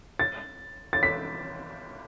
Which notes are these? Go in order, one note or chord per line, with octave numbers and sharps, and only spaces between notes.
A6
A6
B6